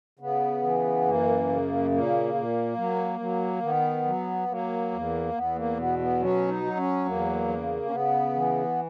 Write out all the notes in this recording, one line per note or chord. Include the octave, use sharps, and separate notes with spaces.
C#3 B3
E3
F#2 A#3
C#3
A#2 A#3
A#2
F#3
F#3
D#3 B3
F#3
F#3 A#3
E2
E2 B3
A#3
B2 B3
B3
F#3 C#4
D#4
F#3
C#4
E2 A#3
C#3
C#4
C#3 B3
E3